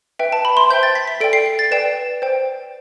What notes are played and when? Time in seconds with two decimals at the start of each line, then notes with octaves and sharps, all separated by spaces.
0.19 B4 E5 G5
0.32 A5
0.45 B5
0.57 C6
0.70 C5 E5 G5 G6
0.83 A6
0.95 B6
1.07 B6
1.20 A4 D5 G5 D7
1.33 C7
1.46 C7
1.59 A6
1.71 B4 D5 G5 E7
2.22 C5 G5